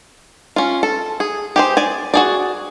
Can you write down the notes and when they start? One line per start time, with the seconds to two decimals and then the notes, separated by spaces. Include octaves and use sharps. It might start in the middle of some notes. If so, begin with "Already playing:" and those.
0.56 C#4 F4
0.83 A4
1.20 G#4
1.56 G4 G#4 C5
1.77 D5 G#5
2.14 F#4 G#4 D5